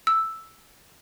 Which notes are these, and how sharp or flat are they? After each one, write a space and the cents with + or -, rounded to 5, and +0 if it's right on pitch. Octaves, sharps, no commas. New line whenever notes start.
E6 +0